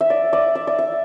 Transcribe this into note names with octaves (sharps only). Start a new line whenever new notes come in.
E5
D5
D5
E5
D5
E5